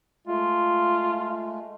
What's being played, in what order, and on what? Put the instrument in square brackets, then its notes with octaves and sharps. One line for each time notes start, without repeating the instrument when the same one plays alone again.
[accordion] G#3 A3 [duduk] F4